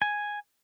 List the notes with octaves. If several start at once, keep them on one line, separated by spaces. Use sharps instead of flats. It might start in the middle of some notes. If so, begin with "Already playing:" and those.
G#5